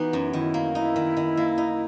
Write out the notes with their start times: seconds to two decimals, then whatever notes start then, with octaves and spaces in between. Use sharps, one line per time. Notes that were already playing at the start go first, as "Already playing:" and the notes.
Already playing: E3 B3 D#4 F#4
0.13 F#2
0.33 D#3 E4
0.54 A#3
0.75 D#4 E4
0.96 D#3
1.17 D#3
1.37 A#3
1.58 D#4